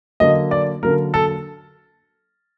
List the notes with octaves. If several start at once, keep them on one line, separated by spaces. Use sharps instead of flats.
D3 F#3 A#3 D#5
D5
D3 F#3 A#3 A#4
A4